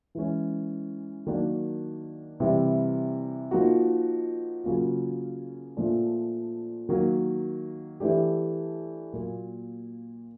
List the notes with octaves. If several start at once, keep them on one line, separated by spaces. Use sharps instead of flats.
E3 G#3 C#4
D#3 F#3 A#3 D4
C3 E3 G3
F3 A#3 D#4 F#4
C#3 F#3 A#3 C#4 F4
A#2 F3 A3 D4
D#3 F#3 A#3
E3 A3 D4 G4
A#2 F#3 A#3